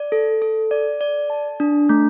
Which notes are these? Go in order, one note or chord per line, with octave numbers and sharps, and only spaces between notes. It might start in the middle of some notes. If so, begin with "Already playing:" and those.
Already playing: D5
A4
A4
D5
D5
A5
D4
A3